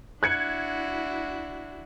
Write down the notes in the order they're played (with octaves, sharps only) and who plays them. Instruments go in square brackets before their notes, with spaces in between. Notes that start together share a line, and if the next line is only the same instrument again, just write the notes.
[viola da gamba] D4 E4 F#4 [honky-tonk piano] F#6 G#6 C#7